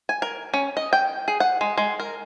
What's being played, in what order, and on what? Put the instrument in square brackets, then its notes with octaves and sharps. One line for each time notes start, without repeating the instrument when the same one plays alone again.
[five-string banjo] G#5
A#4
C#4
D#5
G5
G#4
F#5
G#3
G#3
A#4